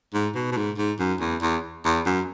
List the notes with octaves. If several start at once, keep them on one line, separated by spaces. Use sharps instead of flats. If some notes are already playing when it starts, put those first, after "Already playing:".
G#2
B2
B2
G#2
G#2
F#2
E2
E2
E2
F#2